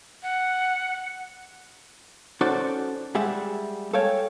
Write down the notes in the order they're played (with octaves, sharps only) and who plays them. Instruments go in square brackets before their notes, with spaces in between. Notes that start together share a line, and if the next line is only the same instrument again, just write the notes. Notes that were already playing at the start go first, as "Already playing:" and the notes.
[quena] F#5
[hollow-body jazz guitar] C#4 D#4 F#4 A4 C5 D5
G3 G#3 G#4 E5 F#5
A4 C#5 F5 G5 G#5